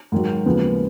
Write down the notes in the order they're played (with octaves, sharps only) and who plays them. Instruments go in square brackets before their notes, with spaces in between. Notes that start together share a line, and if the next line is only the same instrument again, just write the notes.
[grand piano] G#2 D#3 F#3
D#2 C#3 F3 G#3 B3